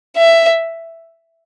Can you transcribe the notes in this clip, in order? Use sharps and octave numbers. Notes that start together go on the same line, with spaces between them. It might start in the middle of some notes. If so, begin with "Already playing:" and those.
E5